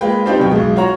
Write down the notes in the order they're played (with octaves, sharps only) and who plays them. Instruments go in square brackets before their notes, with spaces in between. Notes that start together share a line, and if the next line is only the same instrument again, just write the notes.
[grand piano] G#3 A#3 F4 B4 G5
C4 D4 D#4 F4 G4 B4
D1 F#2 B2 G5
B1 G#3
F4 F#4 C#5 A#5